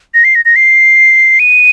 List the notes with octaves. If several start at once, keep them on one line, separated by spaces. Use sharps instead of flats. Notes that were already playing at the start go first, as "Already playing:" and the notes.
A#6
C7
A#6
A#6
C7
D#7